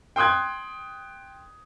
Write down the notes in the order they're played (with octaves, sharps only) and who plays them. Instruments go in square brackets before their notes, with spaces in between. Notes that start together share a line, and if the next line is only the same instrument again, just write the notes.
[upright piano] G5 C6 D#6 F#6 G#6